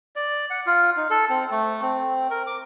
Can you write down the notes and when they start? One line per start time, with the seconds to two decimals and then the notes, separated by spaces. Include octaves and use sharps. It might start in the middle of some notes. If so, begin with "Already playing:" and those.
0.16 D5
0.50 F#5
0.67 F4
0.97 D#4
1.10 A4
1.30 C4
1.51 A3
1.83 C4
2.31 A#4
2.47 D6